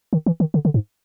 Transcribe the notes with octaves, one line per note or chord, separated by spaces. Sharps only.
D#3
E3
D#3
D3
D3
G#2